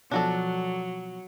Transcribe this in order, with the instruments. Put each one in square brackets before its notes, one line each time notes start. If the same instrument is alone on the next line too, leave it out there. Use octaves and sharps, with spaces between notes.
[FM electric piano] B2 F3 [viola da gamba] F#3 [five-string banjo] D4 F#4 A4